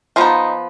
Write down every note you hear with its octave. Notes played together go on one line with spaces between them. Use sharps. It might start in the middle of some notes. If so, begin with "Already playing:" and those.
F3 B3 D#4 F4